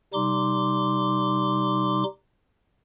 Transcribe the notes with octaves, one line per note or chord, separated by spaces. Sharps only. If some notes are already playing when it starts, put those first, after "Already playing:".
C3 G3 D#4 C6 D6